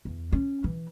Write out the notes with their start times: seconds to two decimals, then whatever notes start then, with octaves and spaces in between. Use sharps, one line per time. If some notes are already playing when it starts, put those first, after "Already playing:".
0.05 E2
0.32 C#4
0.64 E3